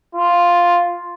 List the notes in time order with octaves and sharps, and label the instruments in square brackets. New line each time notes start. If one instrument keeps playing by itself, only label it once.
[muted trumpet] F4